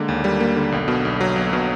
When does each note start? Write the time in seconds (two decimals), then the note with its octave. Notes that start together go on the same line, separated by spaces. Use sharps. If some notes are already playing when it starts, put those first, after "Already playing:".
Already playing: D3 G#3 A#3
0.09 D#2
0.24 G3
0.40 A#3
0.56 D3
0.72 B1
0.88 B2
1.05 B1
1.21 F#3
1.36 B1
1.53 B2